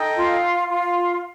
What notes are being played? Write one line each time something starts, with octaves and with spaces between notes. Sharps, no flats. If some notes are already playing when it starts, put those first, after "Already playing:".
Already playing: D#4 A4 D#5 G5
F4
F4